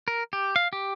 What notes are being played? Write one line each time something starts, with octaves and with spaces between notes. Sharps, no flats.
A#4
G4
F5
G4